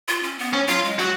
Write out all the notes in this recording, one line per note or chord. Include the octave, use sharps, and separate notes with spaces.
F4
C#4
B3
C#4
F#3 F4
G#3
F#3 F#4